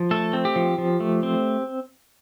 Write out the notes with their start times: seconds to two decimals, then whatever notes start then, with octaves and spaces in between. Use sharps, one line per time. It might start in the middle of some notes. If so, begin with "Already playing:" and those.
Already playing: F3
0.11 A3 A4
0.33 C4
0.45 G4
0.56 F3
0.78 F3
1.00 A3
1.23 C4